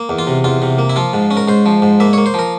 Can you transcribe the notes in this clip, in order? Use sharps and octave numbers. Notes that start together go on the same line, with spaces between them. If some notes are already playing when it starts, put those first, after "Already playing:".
Already playing: A#3
E2
F4
C3
E2 F4
C3
A#3
E4
F3 F4
G#2
C#4
A#4
G#2 C5
F3
G#2
A#3 E5
A#3 C#5
C5
F3 A#4